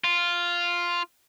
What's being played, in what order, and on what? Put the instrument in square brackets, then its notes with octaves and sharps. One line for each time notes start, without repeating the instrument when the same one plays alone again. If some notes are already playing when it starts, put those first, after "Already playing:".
[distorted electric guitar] F4